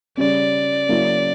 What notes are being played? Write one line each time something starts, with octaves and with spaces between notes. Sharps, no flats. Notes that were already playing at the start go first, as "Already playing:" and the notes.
C#3 G3 C#4 D5
C#3 F#3 A#3 C#4 E4